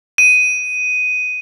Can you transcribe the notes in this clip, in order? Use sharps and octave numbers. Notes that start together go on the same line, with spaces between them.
D#7